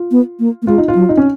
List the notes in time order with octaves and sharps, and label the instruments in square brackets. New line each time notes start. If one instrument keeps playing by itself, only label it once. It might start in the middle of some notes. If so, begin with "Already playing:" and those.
Already playing: [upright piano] F4
[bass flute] B3
A#3
A#3
[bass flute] G#3 [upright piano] F4
[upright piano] D#4
F4
[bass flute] F#3
[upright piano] D#4
C#4